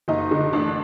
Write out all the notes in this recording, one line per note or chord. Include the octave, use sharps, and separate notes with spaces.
F#1 D#4
D3
A1 D4